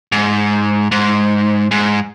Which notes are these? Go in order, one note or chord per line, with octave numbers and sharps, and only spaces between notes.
G#2
G#2
G#2